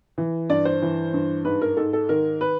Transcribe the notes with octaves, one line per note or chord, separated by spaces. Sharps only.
E3
G2 D5
C5
E3
G2
G#2 B4
A#4
G#2 A4
A4
D#3 A#4
B4